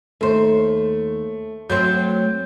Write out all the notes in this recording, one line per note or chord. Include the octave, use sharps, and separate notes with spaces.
D#2 A3 C5
F#3 A3 C4 G6